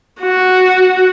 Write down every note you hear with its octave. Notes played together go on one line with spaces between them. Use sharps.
F#4